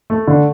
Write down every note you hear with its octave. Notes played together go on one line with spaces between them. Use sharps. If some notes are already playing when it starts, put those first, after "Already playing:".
A3
D3